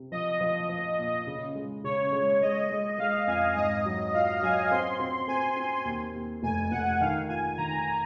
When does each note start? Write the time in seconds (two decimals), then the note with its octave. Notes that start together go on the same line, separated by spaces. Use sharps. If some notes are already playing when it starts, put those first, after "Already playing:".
Already playing: C3
0.12 F3 D#5
0.41 F3
0.69 F3
0.99 A#2
1.27 C#3
1.55 G#3
1.84 C#3 C#5
2.12 G#3
2.41 G#3 D#5
2.70 G#3
2.98 G#3 F5
3.27 F2 G#5
3.56 G#2 D#5
3.86 F#3
4.14 F4 F5
4.42 F#3 G#5
4.71 C4 C6
5.00 C4
5.28 C4 G#5
5.57 C4
5.85 D#2
6.15 D#2
6.43 F1 G#5
6.71 F1 F#5
7.01 D#3 F5
7.29 F4 G#5
7.58 D#3 A#5